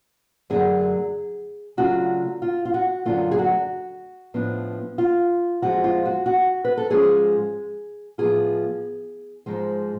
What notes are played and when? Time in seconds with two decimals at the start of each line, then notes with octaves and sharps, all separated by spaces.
0.50 F#2 D3 F#3 A3 G#4
1.77 C#3 F#3 A3 D4 F4 F#4
2.42 F4
2.65 F4
2.74 F#4
3.05 F#2 D3 F#3 A3 F4
3.31 G#4
3.38 F#4
4.34 A2 F3 B3 D4
4.98 F4
5.62 F2 F3 G#3 F#4
5.84 F4
6.06 F#4
6.26 F#4
6.65 B4
6.77 A4
6.90 G#2 F3 G#3 C#4 F4 G#4
8.18 A2 F3 B3 F4 G#4
9.46 G#2 F3 G#3